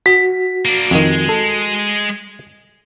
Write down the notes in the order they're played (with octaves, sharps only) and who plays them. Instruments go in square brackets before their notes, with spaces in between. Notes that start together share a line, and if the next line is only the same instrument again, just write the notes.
[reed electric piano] F#4 [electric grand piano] B6
[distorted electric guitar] A#3 D4
[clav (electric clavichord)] F2 D#3 [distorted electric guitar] G#3
[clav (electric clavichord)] A4